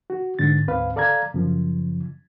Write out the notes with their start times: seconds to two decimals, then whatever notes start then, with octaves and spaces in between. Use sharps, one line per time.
0.10 F#4
0.39 G#2 D3 A6
0.67 D2 G#2 C4 B4 F5
0.96 A4 D5 F5 A#5 G#6
1.34 F#2 C#3 F3